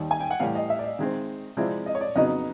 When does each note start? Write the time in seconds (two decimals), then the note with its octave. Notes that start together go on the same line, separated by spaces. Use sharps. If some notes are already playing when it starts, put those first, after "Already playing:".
Already playing: D#2 D#3 G3
0.11 G#5
0.20 G5
0.31 F#5
0.40 A2 E3 G3 F5
0.55 D#5
0.70 E5
0.79 D5
0.84 D#5
0.99 D#3 G#3 C4
1.57 C3 F3 G#3 C4 E4 D5
1.86 D#5
1.95 C#5
2.01 D5
2.15 F2 C#3 F#3 B3 D#4 D#5